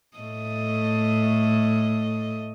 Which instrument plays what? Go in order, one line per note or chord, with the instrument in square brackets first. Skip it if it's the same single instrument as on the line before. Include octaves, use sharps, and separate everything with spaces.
[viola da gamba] A2 A3 D#5